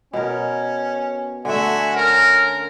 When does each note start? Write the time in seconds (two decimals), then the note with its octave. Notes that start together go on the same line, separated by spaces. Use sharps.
0.13 B2 C#4 A#4
1.45 D3 A3 F#4 E5 G#5
1.96 C#4 A#4